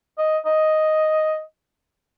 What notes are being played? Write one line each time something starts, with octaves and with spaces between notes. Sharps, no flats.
D#5
D#5